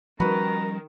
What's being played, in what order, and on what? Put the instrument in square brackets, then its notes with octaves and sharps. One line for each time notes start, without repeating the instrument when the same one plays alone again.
[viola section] D#3 [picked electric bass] F3 G3 C#4 [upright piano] F#4 B4 [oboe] A#5